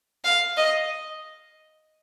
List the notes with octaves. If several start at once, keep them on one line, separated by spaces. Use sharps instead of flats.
F5
D#5